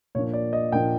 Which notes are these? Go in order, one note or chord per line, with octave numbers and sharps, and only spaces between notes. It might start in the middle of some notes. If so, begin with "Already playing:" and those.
A#2 F3 A#3 D4 C#5
D5
D#5
A#2 F3 A#3 D4 G5